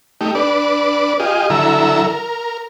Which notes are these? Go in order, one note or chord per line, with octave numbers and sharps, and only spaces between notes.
A3 D#4 G4
D4 B4 D5
F4 G4 G#4 D#5
D3 F#3 E4 A4 E5 A#5
A#4